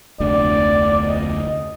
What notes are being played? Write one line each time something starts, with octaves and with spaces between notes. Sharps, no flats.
F1 D2 D3 D5
D#5